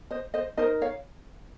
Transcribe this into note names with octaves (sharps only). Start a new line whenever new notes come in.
C5 D#5
C5 D#5
D#4 A#4 C5 D#5
C#5 F5